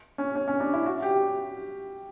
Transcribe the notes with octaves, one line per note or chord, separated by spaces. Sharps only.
C#4
C#4
C#4
D4
E4
F#4
G4